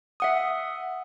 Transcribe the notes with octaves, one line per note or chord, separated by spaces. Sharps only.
E5 F#5 D#6